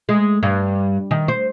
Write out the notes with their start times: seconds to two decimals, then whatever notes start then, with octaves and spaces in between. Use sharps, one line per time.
0.09 G#3
0.43 G2
1.11 D#3
1.28 C5